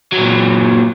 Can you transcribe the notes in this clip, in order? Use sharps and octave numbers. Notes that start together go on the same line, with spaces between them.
A#2 F#3